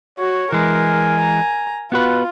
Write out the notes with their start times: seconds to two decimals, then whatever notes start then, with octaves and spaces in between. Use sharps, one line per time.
0.19 F#4 C#5
0.52 E3 G#3 A#4 G#5
1.21 A#5
1.92 B3 F4 F#4 B4